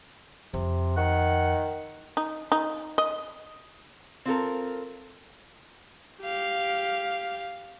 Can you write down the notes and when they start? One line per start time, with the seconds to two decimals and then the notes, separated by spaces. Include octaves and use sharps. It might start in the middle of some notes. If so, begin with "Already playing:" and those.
0.54 F2 C3
0.97 D#3 F#5
2.17 D#4
2.52 D#4
2.98 D#5
4.26 C4 F4 A4 A#4
6.22 G4 F5